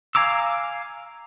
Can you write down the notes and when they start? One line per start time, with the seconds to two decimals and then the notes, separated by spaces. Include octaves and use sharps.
0.15 F5 G#5 A#5 D6 E6